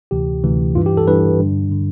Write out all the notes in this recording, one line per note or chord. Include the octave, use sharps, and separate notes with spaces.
D2 C3 E3 G4
D2 C3 E3
G2 E3 F4
G4
A4
G2 E3 B4
G2 D3
D3